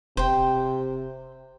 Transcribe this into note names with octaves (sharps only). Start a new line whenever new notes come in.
E1 C3 C5 G5